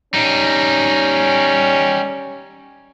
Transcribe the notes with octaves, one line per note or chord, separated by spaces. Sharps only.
G3 C#4 D#4